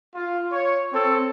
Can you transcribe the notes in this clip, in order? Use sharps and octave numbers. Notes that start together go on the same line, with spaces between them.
F4
C#5
C4 A4